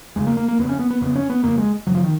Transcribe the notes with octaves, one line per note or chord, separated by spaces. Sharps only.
F2 C#3 G#3
A#3
A#3
A#3
F2 C#3 B3
C#4
B3
B3
F2 C#3 B3
C#4
B3
F2 C#3 A#3
G#3
F#2 C#3 F#3
F3
D#3